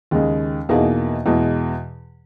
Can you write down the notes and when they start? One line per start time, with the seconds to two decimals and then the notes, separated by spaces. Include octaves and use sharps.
0.11 D#2 C#3 G#3
0.69 E2 B2 A#3 D#4 G#4
1.26 E2 B2 G#3